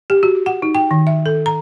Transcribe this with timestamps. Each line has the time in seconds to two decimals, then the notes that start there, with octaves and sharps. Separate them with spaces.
0.10 G4
0.23 F#4
0.46 F#5
0.62 D#4
0.75 G5
0.91 D#3
1.07 E5
1.26 A4
1.46 A#5